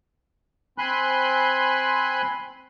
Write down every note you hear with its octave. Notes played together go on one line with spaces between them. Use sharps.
C4 G#5 B5 C6 F#6